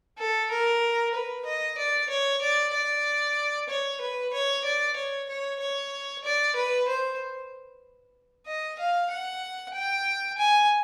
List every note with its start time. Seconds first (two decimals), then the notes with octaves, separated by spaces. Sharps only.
0.19 A4
0.51 A#4
1.14 B4
1.46 D#5
1.78 D5
2.09 C#5
2.42 D5
2.73 D5
3.69 C#5
4.01 B4
4.33 C#5
4.65 D5
4.96 C#5
5.29 C#5
5.60 C#5
6.24 D5
6.56 B4
6.88 C5
8.47 D#5
8.79 F5
9.11 F#5
9.74 G5
10.38 G#5